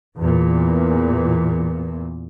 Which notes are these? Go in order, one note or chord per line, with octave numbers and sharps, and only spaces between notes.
E2 A#2